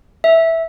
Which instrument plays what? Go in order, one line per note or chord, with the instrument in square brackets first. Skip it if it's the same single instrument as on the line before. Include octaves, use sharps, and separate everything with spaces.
[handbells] E5